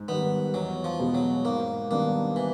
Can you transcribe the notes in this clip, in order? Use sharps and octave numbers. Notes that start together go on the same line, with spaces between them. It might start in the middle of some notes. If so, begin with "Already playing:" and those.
Already playing: G#2
D#3 G3 B3
E2 F#3
F3
B2 G#3 B3
F#3
G#2 A#3
D#3 G3 A#3 B3 D4
E3